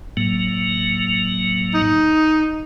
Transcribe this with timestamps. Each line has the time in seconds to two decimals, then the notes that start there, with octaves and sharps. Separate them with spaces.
0.17 A2 F#3 A#3
1.74 D#4